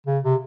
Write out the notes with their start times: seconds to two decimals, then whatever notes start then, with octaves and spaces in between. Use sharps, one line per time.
0.07 C#3
0.24 C3